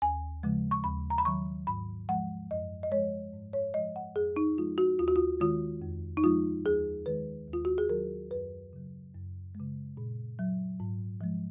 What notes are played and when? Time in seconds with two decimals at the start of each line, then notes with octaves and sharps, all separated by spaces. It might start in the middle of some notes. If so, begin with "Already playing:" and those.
0.02 D#2 G#5
0.43 C#3 F3 G#3
0.71 C#6
0.84 D#2 B5
1.10 A#5
1.18 B5
1.25 D#3 F#3 C#6
1.67 G#2 B5
2.09 F3 G#3 F#5
2.51 F#2 D#5
2.83 D#5
2.92 F3 G#3 C#5
3.33 G#2
3.53 C#5
3.74 F3 G#3 D#5
3.96 F#5
4.16 F2 G#4
4.36 D#4
4.58 F3 G#3 F4
4.78 F#4
4.99 D#2 F4
5.08 F#4
5.16 F4
5.40 D#3 G#3 F4
5.82 F2
6.17 D#4
6.23 F3 G#3 F4
6.66 D#2 G#4
7.06 D#3 G#3 B4
7.48 D#2
7.53 F4
7.65 F#4
7.78 G#4
7.89 D#3 F#3 A#4
8.30 F#2 B4
8.73 C#3 F#3
9.14 F#2
9.55 C#3 G#3
9.97 A#2
10.39 F#3
10.80 G#2
11.21 F3 G#3